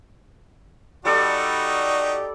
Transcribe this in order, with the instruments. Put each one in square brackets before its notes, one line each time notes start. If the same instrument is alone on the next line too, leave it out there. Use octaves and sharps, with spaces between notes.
[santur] G3 A4 D5 [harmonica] D#4 F#4 G4